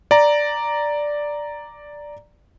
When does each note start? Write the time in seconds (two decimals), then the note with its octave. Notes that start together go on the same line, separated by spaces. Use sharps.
0.11 D5 A#5